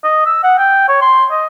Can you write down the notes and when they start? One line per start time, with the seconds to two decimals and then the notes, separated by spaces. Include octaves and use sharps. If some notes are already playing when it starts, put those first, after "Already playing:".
0.04 D#5
0.26 E6
0.44 F#5
0.58 G5
0.89 C#5
1.01 C6
1.31 D#5